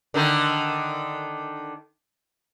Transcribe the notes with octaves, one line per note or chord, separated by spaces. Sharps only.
D3 D#3 D#4